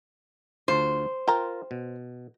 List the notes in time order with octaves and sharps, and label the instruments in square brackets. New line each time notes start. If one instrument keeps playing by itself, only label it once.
[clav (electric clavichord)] D2 F4 [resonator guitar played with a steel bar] C5
[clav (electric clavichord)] F4 A#4 [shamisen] G5 A#5
[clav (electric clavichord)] B2